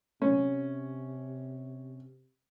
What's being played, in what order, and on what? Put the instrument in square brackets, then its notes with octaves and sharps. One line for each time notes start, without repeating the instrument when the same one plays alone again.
[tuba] C3 [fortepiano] C#4